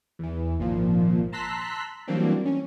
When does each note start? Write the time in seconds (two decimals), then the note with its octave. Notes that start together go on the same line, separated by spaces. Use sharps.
0.19 E2 E3
0.59 G#1 A#2 F3
1.32 A5 A#5 C6 E6 F#6 B6
2.07 E3 F#3 G3 A#3 C4 D4
2.45 C#4